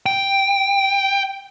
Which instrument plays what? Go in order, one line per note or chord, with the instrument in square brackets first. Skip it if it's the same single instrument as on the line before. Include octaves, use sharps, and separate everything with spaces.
[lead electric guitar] G5